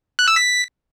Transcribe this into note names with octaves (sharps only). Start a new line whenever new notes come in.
F#6
E6
B6